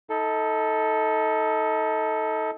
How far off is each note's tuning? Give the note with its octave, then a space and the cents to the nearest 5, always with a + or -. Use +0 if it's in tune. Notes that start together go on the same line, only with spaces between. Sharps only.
D#4 +30 A4 +0